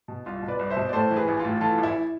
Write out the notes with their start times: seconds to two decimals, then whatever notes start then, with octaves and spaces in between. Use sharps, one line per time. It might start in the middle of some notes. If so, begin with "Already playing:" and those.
0.08 B2
0.26 C2 F4
0.42 B2
0.48 B4 D5
0.59 C2
0.70 C5 E5
0.77 B2
0.89 D5
0.93 A2 A4 C5
1.11 E3
1.16 G#4 B4
1.28 A1
1.39 F4
1.45 A2
1.61 E3 F4 A4
1.78 A1
1.83 E4